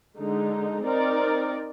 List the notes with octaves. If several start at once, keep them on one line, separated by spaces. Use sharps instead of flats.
D3 G#3 D#4
C4 D#4 A#4 D5